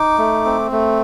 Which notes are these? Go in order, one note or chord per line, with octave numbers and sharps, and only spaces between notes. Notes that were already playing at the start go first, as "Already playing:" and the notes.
Already playing: D#4 D6
A3
C4
A3